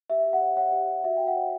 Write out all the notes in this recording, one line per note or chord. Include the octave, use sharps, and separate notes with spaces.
G4 E5
G4
F#5
C#5
C#5 F#5
G4
G4
F#4 E5
F#4 G5
F#5
C#5